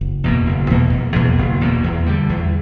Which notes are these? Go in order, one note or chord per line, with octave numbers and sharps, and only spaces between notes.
F#1
E2 B2 A#3
F#1
E2 B2 A#3
F#1
E2 B2 A#3
F#1
E2 B2 A#3
E2
D3 G3
E2